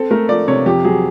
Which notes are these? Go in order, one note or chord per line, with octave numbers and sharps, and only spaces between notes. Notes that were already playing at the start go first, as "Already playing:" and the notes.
Already playing: C4 A4
A3 A#4
F3 D5
C3 C#5
F2 G4
F#3 G#4